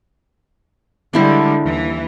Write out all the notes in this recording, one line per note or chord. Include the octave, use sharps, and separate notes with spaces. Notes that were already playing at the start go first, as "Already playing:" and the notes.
D3 G3 G#3 D4 E4 C5
D#2 E3